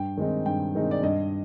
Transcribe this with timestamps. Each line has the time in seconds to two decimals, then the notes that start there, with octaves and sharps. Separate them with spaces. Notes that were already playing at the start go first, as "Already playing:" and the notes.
Already playing: G2 G5
0.17 D#3 G#3 C4 D#4
0.46 G2 G5
0.75 D#3 G#3 C4 D#4
0.91 D5
1.03 G2 D#5